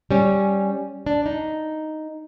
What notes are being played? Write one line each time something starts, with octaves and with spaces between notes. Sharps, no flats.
G3 C#4
D4
D#4